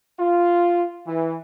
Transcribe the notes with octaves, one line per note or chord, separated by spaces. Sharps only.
F4
E3